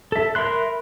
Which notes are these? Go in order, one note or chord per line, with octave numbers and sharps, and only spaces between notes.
A4 E5
A#4 E5 B5 C6 F#6